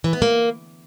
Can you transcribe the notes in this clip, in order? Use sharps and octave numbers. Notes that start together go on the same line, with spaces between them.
E3
B3
A#3